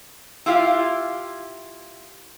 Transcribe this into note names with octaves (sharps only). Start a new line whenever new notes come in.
E4 F4 G4 F5